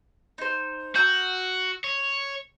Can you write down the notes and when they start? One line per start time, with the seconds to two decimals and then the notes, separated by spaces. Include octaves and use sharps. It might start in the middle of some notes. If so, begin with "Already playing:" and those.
0.38 D#4 C5
0.95 F#4 A#5 E6 G6
1.84 C#5